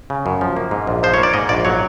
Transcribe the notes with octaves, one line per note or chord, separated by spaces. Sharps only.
C#3
F#2
F3
A#3
G#2
A#1
F3 C5
A#3 C#5
D5
G#2 D#5
A#1 D5
F#3 C#5